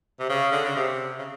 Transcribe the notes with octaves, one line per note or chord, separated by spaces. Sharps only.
C3
C#3
D3
C#3
C3
C#3